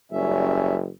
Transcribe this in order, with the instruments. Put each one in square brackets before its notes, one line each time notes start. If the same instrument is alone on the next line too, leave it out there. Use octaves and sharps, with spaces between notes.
[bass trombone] F#1 [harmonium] G3 C#4 E5